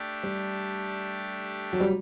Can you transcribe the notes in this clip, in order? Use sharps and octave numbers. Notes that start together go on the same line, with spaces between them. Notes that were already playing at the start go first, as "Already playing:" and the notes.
Already playing: A3 D4 G4
G3
F#3
G3